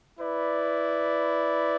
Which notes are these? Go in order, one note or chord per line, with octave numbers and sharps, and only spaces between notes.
E4 B4 D5